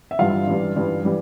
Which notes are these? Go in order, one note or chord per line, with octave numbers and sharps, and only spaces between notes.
E5
G2 E3 G3 F4 F5
G2 E3 G3
G2 E3 G3
E3 G3